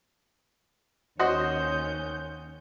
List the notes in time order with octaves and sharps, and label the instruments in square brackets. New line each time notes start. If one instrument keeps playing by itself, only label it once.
[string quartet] D#2 C#4 G6 [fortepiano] F#4 C5 D#5